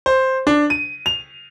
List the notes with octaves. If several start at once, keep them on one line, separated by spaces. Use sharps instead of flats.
C5
D4
D#7
F7